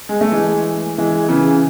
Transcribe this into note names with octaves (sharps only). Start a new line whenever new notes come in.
G#3
A3
E3 G#3
E3 G#3
C#3 E3